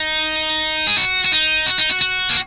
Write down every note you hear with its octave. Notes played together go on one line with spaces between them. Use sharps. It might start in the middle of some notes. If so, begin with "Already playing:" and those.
Already playing: D#4
G#4
F#4
F#4
D#4
F#4
D#4
F#4
F#4
A#3